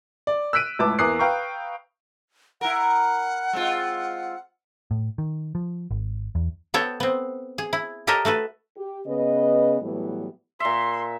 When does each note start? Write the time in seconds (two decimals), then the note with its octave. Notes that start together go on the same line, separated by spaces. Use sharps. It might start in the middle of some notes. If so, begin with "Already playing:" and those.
0.27 D5
0.53 E6 F#6 B6 D7 D#7
0.79 C#2 A2 B4 A5 D6
0.99 E2 A#3 D6 D#6 F#6 C7
1.19 B4 F5 G5 A#5 C#6
2.61 E4 A#4 F#5
3.53 G#3 C4 F4
4.91 A2
5.18 D#3
5.55 F3
5.91 G#1
6.35 E2
6.74 B3 A4 C#5 G5
7.00 B3 C4
7.58 G#4
7.73 E4
8.07 G4 A4 A#4 C#5 D#5 E5
8.25 A3 F#4 A4 B4
8.75 G4
9.07 C#3 B3 B4 D#5
9.81 A2 E3 F#3 G3 B3
10.60 A#2 E5 C6